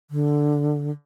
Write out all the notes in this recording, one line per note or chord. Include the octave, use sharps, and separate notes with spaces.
D3